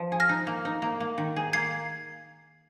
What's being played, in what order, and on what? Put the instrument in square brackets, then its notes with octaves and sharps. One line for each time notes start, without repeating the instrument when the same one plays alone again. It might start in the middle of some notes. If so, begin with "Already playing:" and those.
Already playing: [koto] F3
G#4
[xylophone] F6 A#6
[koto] D#4
A#3
D#4
A#3
A#3
D#3
G#4
[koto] A#3 [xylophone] G#6 C7